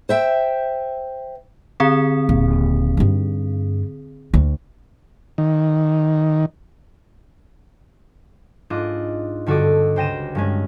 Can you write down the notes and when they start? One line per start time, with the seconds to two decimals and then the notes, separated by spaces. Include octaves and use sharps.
0.09 C5 E5 G5
1.80 D3 C4 G#4
2.29 D#1
2.97 G2 D#4
4.34 D2
5.38 D#3
8.70 G#2 D4 F4 D#5 D6 F#6
9.46 G2 D3 F#4 A4 D#5 D6
9.96 C#2 C5 G5 A#6 D#7 E7
10.35 G2 G#3 C#4